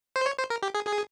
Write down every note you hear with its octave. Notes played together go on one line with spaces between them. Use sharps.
C5
C#5
C5
A#4
G4
G#4
G#4